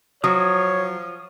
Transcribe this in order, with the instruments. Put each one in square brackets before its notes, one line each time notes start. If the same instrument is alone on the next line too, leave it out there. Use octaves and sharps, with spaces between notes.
[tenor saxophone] F3 [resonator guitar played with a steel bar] F#3 [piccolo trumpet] C#5 [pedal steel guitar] D#6